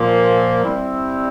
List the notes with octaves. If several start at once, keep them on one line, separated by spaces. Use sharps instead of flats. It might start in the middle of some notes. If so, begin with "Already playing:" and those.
Already playing: A#2 F3 A#3
G3 C4 E4